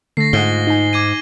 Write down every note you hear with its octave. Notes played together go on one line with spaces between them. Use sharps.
D3 A3 A#6 C7
G#2 F4 F#5 G7
D#4 G#5
D6 G#6 D#7